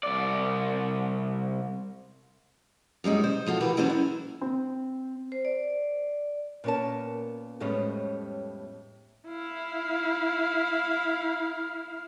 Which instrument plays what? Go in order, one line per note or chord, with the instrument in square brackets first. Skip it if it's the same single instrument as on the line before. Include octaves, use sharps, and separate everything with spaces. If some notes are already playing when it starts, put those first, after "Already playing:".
[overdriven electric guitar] C2 D5
[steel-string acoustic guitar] F#2 G3 G#3 D#4
C5
F3 F4 F#4 A4
E3 F#4 G4 A#4 B4
E3 F#3 B3 C#4 D4 C5
E4
[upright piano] C4
[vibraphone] C5
D5
[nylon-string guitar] A#2 B3 C#4 A#4 A5
F2 A2 G3 G#3 B3 C#4
[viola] E4 F5